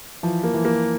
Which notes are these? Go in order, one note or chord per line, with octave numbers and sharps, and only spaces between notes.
E3 F3
A#3
E3
A#3